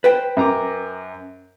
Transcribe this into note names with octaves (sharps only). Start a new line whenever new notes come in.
B4 C5 G5
F#2 A#5 D6